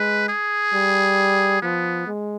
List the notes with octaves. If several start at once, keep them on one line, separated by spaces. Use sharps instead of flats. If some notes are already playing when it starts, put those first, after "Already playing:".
Already playing: G#3 B4
G#4
G3
F3 B3
G#3